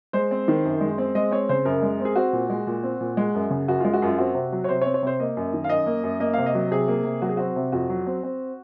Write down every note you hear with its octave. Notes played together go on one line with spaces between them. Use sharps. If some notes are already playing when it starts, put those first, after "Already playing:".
G#3 C5
C4
D#3
F#2
G#3
C4
G#3 D#5
C4 C#5
C#3 C5
F#2 A#4
G#3
C4
G#4
C4 F#4
A#2
G#3
A#2
C4
A#2
G#3
F#2
C#3
F#2 F#4
G#3 F4
F#4
F#2 F4
C4 F#4
C3
F#3
C#5
C3 C5
C#5
C4
C#5
C3 C5
A#3 D#5
F#2
D#3
F5
F#2 D#5
A#3
F#2
A#3 D#5
C3 F5
D#5
F#3
C3 G#4
A#3
C3
F#3 F#4
G#4
C4 F#4
C3
F2 F#4
F#3
C4
C4